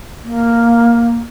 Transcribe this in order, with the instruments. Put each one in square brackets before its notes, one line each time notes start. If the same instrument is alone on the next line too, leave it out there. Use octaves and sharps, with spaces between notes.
[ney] A#3